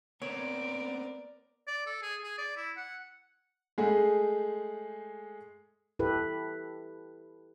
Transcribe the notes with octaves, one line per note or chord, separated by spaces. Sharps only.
B3 C4 A#4 C#5 D5 D7
D5
A4
G#4
G#4
D5
E4
F#5
G#3 A3 G#4
E4 G4 A4 B4